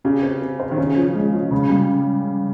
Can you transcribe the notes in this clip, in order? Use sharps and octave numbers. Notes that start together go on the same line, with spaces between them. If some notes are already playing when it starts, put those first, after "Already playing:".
C#3 G4
C4
C4
C5
D#3
C#3 C#4
F3
G#3
F3
C#3
G3